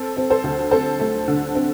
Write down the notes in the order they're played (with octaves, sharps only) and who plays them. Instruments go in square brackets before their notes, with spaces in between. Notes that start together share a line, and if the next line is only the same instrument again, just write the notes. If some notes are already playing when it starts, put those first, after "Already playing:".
Already playing: [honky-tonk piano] C4 A4 C5
C4
A4 C5
D2
C4 A4 C5
A3
D3
C4